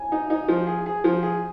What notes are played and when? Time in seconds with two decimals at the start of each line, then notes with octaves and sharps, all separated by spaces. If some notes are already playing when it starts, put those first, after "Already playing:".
Already playing: G#5
0.12 D#4
0.30 D#4
0.48 F3
0.67 G#4
0.86 G#4
1.04 F3
1.23 G#4